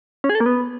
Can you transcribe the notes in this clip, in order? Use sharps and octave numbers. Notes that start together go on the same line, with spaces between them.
C#4
G#4
A4
A#3
B3